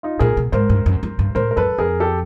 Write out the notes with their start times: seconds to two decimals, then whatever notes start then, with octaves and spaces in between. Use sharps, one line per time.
0.03 D#4 F4
0.19 A#2 G#4 A#4
0.37 B2
0.52 G#2 A#4 C5
0.69 G2
0.86 F#2
1.03 F#2
1.19 G2
1.35 A2 A#4 C5
1.51 A#4
1.56 F#2 A4 B4
1.78 F2 G#4 A#4
2.00 G4 A4